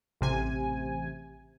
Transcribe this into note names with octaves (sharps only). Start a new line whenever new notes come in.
A1 C3 G#5